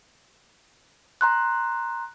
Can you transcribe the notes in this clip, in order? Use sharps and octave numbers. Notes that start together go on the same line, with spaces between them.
A#5 C6 F#6